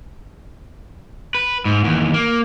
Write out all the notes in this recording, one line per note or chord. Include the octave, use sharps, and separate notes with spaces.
B4
G#2
D#2 E3
A#3